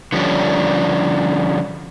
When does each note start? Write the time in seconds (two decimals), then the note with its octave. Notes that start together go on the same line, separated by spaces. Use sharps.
0.12 D3 F3 G3 C#4 D4